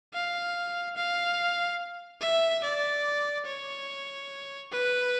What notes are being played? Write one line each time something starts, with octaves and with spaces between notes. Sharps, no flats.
F5
F5
E5
D5
C#5
B4